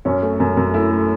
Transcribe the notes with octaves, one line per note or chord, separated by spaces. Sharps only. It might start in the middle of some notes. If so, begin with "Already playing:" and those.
F#2 C#4
A3
F#2
F#2
A3 E4
A3